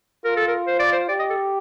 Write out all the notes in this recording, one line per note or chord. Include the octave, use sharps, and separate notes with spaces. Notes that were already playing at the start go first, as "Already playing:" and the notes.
F4 A#4
A4
A#4
C5
D5
C5
G4 D5
D#5
A4